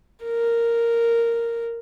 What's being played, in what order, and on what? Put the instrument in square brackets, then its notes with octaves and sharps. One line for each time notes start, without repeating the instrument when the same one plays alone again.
[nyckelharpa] A#4